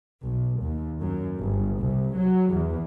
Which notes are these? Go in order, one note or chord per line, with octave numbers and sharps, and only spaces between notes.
B1
D#2
F#2
G1
C2
F#3
E2